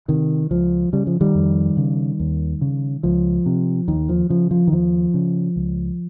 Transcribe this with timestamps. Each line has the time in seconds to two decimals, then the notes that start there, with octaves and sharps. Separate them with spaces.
0.08 C3 D#3
0.51 C#2 F3
0.93 C#3 G3
1.07 F3
1.21 D#3 G3
1.35 F2
1.77 C#3
2.20 D#2
2.61 C#3
3.03 C#2 F3
3.46 C3
3.88 D#2 D#3
4.09 F3
4.30 C#3 F3
4.51 F3
4.67 D#3
4.72 D#2 F3
5.14 C#3
5.56 C#2